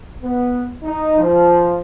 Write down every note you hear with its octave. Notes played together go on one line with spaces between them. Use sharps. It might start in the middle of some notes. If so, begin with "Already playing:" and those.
B3
D#4
F3